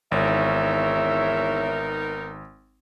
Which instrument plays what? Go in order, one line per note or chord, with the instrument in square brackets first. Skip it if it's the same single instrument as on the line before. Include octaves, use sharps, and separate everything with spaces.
[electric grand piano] G#1 [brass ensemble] E2 C#5 E5 [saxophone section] B3 D#4 A#4